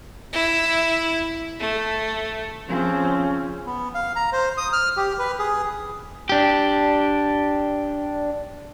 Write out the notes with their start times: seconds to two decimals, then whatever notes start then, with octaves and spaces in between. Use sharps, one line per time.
0.33 E4
1.60 A3
2.68 C#3 F3 C4 C#4
3.66 B3
3.94 F5
4.16 A#5
4.32 C5
4.57 D#6
4.73 F6
4.97 G4
5.19 B4
5.39 G#4
6.29 D4 G4